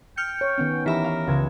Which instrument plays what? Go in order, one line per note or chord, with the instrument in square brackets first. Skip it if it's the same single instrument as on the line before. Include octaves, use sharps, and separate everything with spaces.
[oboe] G5 [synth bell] F6 G6 C#7
[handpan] C#5
D#3 B3 C#4
[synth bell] E3 E5 B5 [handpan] D#4 G4 [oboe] A#4 [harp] B6
[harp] F5
C#2 G#6 E7